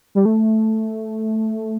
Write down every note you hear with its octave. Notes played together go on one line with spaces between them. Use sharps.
G3
A3